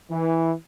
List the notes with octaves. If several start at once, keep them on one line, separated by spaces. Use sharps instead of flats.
E3